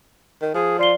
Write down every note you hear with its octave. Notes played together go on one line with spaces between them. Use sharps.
D#3
F3 G#4
F4 D5 C7 G7